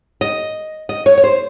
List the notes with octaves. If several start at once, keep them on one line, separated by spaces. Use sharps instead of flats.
D#5
D#5
C#5
C#5
C5